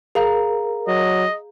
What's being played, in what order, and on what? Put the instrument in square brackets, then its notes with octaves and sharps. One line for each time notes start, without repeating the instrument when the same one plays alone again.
[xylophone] G#4 F5 A#5 [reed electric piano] A#4
[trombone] F#3 [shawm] D#5